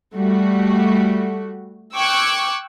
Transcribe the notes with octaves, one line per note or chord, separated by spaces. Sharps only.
G3 A3 F#4
G5 C#6 D6 E6 F#6 G#6